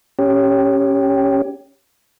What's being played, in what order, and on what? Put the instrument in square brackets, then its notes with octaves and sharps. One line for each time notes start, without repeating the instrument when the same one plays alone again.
[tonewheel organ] C#4 G4